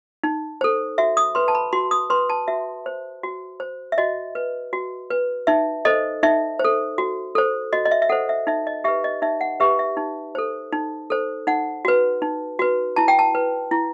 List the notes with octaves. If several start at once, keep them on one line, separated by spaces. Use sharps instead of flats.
D#4
A4 C5
F#4 E5
D#6
B4 C6
A5
B5
F#4 C6
D#6
B4 C6
A5
F#4 E5
C5
F#4
C5
E5
F#4 D#5
B4
F#4
B4
D#4 E5
A4 C5 D#5
D#4 E5
A4 C5
F#4
A4 C5
F#4 D#5
D#5
E5
E5
A4 C5 F#5
E5
D#4 E5
D#5
G4 B4 E5
D#5
D#4 E5
F#5
G4 B4 E5
E5
D#4
A4 C5
D#4
A4 C5
D#4 F#5
F#4 B4
D#4
F#4 B4
E4 A5
G5
A5
B4
E4